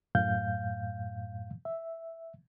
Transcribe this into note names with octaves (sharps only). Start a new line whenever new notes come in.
F#2 A2 F5 G6
E5